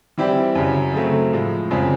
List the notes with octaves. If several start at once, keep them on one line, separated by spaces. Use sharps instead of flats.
E3 G3 C4 E4 G4
F#2 C#3 F#3
C#3 F#3 A3 C4
A2 F3 G#3
F#2 C#3 F3 G#3 C4